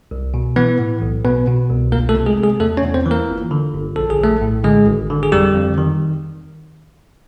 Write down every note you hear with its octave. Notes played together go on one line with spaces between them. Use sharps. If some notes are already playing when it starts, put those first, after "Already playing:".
C2
B2
E3 B3 B4
A2
B1
B2 B3 B4
B2
C2
G1 A#3 A#4
A3 A4
C3
G#3 G#4
C3
G#3 G#4
E2 A3 A4
C#4 C#5
E2
C4 C5
E3
A#3 A#4
G1
D3
G1
A#1 A4
G#4
A#1 A3 A4
A2
D3 G#3 G#4
G#1
D3
G#4
F2 G3 G4
F2
D#3